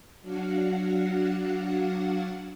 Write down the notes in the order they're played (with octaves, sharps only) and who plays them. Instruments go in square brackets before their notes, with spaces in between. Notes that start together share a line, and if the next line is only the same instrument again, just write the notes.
[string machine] F#3 D4 F#4 F5 F#5